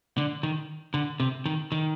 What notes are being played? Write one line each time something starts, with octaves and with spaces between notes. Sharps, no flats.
D3
D#3
D3
C3
D#3
D#3